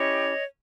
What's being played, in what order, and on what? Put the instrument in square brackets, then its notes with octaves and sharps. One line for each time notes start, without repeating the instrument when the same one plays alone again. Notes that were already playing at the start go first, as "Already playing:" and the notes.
Already playing: [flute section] C#4 E4 G4 C#5 D#5